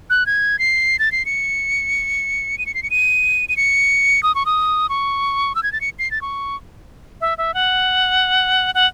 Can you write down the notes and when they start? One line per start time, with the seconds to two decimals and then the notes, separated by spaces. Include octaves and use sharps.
0.10 F#6
0.26 G#6
0.59 C7
0.99 A6
1.12 C7
1.26 C#7
2.58 D#7
2.66 C#7
2.74 C7
2.83 C#7
2.90 D#7
3.49 D#7
3.57 C#7
4.23 D#6
4.35 C#6
4.46 D#6
4.89 C#6
5.55 E6
5.63 G#6
5.73 A6
5.81 C#7
5.99 C7
6.11 A6
6.22 C#6
7.21 E5
7.38 E5
7.54 F#5
8.75 F#5